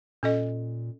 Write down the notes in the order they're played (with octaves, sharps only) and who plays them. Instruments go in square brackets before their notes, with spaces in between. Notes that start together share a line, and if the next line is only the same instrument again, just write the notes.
[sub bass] A#2 [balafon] C#4 A4 D#5